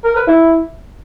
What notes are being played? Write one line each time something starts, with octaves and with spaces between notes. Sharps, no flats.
A#4
B4
E4